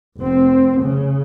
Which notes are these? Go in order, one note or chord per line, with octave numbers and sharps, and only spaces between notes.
F1 C4
C#3